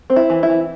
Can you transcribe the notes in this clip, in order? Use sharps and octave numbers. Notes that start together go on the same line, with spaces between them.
C4
E4
E3
E4
E3